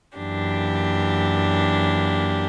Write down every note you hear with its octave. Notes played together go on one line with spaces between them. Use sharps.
F#2 E3 A#3 D4 G4